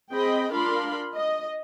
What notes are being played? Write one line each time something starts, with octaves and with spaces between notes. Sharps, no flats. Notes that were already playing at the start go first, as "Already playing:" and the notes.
C4 G#4 D#5 G5 B5
D4 F4 A#4 F5 B5 C6
D#5